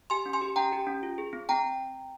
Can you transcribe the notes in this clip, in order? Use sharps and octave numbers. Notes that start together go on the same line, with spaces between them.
G4 G#5 C6
C#4
G#5 C6
G4
C#4 G5 A#5
G4
C#4
F4
G#4
C4
C4 G5 A#5